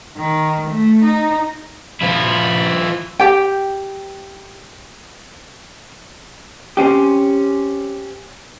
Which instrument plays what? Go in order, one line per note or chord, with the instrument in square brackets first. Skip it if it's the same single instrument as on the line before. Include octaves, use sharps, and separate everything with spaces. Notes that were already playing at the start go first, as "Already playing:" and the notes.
[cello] D#3
A3
D#4
[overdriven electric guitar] F3 E4
[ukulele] G4 G5
[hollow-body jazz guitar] C4 C#4 G4